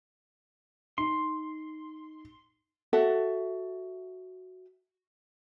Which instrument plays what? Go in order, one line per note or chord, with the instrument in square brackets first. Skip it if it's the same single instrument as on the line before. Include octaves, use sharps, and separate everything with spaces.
[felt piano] D#4 [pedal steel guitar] C6
[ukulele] F#4 A4 E5 F#5